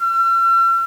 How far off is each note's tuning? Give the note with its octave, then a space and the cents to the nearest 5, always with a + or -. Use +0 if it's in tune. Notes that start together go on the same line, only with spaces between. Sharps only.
E6 +45